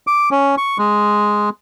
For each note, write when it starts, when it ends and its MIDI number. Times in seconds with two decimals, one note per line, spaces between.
0.07 0.29 86
0.31 0.55 61
0.58 0.78 85
0.78 1.49 56